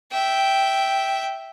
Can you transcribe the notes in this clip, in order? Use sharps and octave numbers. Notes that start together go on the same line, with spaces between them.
E5 G5